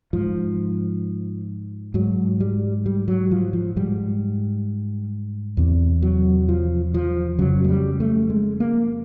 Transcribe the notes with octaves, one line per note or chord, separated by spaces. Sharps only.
G#2 F3
G#2 F#3
G3
G3
F#3
F3
F3
G#2 G3
E2 C3
F#3
F3
F3
F2 C#3 F#3
G#3
G3
A3
G#3
A#3